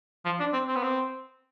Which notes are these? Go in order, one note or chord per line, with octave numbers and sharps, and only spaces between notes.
F3
D4
C4
C4
B3
C4